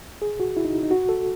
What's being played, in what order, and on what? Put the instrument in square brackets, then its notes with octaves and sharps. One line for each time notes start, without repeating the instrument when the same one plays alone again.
[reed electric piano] G#4
F#4
E4
D#4
D#4
F#4
A4